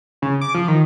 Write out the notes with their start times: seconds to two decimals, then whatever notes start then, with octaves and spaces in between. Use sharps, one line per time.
0.22 C#3
0.41 D6
0.55 F3
0.68 D#3